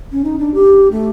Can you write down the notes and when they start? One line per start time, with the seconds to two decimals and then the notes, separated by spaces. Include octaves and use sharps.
0.12 C#4
0.24 D#4
0.39 D4
0.54 G4
0.92 A3